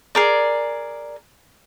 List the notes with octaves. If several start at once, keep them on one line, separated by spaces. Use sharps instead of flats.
G#4 A#4 D5